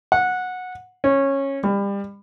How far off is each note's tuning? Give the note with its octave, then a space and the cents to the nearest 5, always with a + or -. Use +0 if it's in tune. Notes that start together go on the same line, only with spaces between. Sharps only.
F#5 -15
C#4 -15
G3 +30